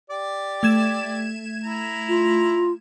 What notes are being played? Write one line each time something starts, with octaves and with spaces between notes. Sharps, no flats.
G4 D5
A3 G#6 E7
E4 A#5
F4